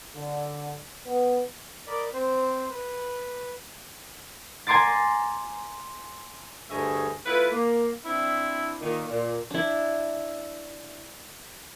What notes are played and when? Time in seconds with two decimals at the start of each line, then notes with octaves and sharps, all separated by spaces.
0.14 D3
1.04 B3
1.87 A#4 D5 D#5 B5 D6
2.13 C4 C5
2.70 B4
4.67 G#5 A#5 C6 D6 A6
6.70 D2 G2 G#4 C#5 D#5 E5
7.26 A3 E4 F4 B4
7.51 A#3
8.05 C4 D4 E4
8.81 A#2 D#3
9.08 A#2
9.50 D4 E4